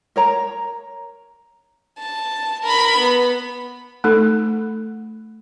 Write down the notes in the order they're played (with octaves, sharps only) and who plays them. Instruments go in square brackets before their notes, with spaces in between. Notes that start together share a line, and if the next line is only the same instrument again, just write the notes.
[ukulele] A#4 C#5 A#5
[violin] A5
A#4 B5
B3
[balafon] A3 D#4 A4